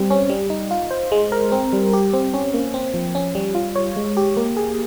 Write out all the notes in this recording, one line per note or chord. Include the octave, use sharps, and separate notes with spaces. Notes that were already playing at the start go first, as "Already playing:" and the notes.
Already playing: G3 C4
C#4
G3
D#4
F4
C5
G#3
A#4
C4
G3
G4
C4
C#4
A#3
C4
F3
C#4
G3
F4
C#5
G#3
G4
A#3
G#4